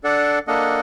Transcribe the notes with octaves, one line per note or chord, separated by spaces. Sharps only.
D4 A4 D5 F#5
A#3 D4 A4 D#5 F#5